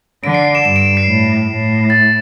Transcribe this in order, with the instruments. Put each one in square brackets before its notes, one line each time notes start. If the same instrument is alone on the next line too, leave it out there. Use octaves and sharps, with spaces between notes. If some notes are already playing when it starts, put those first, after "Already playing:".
[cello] D3 [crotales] D7
[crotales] C7
D7
E7
[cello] G2 [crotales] E7
[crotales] D7
E7
C7
[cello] A2
A2
[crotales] A6